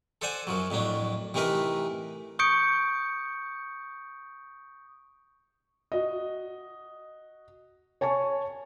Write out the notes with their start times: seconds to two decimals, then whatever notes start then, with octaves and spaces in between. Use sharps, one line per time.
0.22 A4 C5 D5 F#5 G#5
0.47 F#2 F3 F#3
0.70 F2 A2 F#3 D4
1.34 C3 E3 A3 D#4 A#4 B4
2.39 C#6 D#6 G6 C#7 D7
5.92 F#4 D#5
8.01 C#5 G#5 A5 C#6